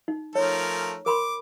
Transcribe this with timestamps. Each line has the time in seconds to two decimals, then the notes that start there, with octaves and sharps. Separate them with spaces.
0.08 D#4
0.35 F3 A3 A#4 C#5
1.06 A#4 B5 C6 D6